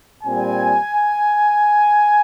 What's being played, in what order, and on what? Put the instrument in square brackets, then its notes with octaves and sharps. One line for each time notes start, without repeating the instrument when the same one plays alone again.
[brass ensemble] A#2 G3 C4 G#5